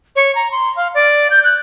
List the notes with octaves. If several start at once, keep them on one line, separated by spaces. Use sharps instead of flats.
C#5
A#5
C6
F5
D5
G6
F#6